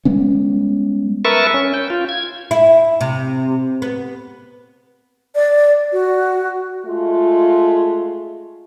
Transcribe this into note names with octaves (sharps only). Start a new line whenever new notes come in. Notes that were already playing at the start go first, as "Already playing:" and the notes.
G3 G#3 B3 C#4
A#4 B4 E5 A5 C#6
C#4
G5
F4
G#6
E4
C3
B3
D5
F#4
G#3 A3 F4